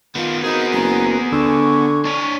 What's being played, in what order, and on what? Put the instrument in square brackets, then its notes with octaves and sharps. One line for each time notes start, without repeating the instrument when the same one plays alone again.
[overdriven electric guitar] D#3 B3 [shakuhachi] F4
[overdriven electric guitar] B3 G#4 [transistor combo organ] C4 F#4 A#4 [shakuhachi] D#4
[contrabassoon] F#1 [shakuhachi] A#5
[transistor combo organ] D2 E6 [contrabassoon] D3 [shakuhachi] C#6
[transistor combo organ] G#5
[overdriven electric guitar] D4 C#5